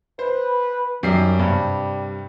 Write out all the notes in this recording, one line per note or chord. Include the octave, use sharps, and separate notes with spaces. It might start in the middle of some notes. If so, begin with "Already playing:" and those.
B4 C5
F#2 D#3 G3 C7
G2 C3 G3